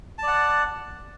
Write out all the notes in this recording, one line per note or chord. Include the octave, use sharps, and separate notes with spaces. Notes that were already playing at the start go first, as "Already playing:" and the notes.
D5 F#5 A5